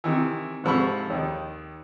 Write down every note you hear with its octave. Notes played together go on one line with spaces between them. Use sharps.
C3 D#3 E3
G#2 C3 F3 A4 B5 C#6
D#2 D#3